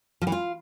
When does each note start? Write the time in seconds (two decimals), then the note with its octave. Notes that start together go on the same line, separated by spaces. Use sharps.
0.22 F3
0.27 E3
0.32 F4